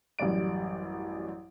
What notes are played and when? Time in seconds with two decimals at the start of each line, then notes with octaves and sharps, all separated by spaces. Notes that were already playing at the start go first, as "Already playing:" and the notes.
0.19 A1 F#2 G3 D5 D7